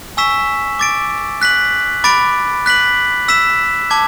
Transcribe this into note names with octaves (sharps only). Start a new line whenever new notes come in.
G#5 C#6 E6 B6 E7
D6 A6 D7
F#6 B6 F#7
B5 D6 A6 D7
F#6 B6 F#7
E6 B6 E7
A5 D6 G#6